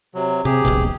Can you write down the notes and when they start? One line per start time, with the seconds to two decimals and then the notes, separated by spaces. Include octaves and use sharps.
0.14 C3 F#3
0.45 C3 G4 G#4
0.65 D#1 A#1 B2